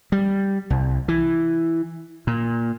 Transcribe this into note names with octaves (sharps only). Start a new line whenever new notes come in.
G3
C2
E3
A#2